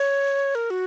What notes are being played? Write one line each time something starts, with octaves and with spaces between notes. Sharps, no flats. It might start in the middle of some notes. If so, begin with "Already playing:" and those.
Already playing: C#5
A#4
F#4